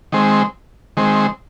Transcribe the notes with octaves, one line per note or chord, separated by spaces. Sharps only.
D#3 G#3 C4
D#3 G#3 C4